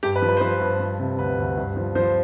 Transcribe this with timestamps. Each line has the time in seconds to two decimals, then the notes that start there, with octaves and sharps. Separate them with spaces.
0.03 G2 G4
0.16 B4
0.22 F3
0.29 B4
0.37 C5
0.41 F3 B4
0.61 G2
0.80 F3
0.99 C3
1.19 D2 B4
1.38 D2
1.57 G2
1.77 F3
1.95 F3 C5